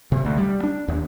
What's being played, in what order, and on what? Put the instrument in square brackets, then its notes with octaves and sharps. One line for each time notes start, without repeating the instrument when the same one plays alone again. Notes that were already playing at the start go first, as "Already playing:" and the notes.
[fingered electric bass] C3
D2
G3
D4
D#2